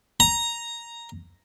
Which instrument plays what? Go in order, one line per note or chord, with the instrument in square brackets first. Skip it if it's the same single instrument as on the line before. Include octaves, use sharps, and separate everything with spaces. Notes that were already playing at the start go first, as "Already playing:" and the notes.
[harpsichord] A#5